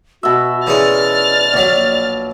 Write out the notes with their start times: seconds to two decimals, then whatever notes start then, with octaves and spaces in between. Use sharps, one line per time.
0.23 B2 F#4 E5
0.67 E3 G#3 C#4 D5 F6 A6
1.54 A#1 F#3